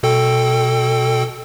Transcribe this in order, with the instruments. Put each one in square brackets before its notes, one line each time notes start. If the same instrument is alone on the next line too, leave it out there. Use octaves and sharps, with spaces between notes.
[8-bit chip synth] B2 A4 G5